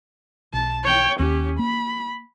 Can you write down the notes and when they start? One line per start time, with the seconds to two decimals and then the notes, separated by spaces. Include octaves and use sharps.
0.54 B1 A5
0.84 C#5 G5
1.19 D#2 C#4 G4
1.59 A#3 B5